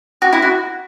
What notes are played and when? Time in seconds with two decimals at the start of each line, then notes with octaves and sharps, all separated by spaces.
0.22 F#4
0.33 E4
0.42 F#4